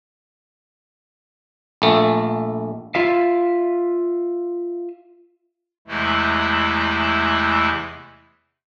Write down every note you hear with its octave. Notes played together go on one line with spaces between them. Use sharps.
A#1 A3
F4 E5 F5
E2 C3 E3 G#3 A3 E4